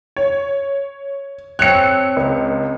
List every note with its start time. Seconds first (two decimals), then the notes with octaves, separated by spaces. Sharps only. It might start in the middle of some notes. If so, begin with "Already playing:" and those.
0.16 C#5
1.59 C4 A4 C#5 F#6 C#7
2.16 C#2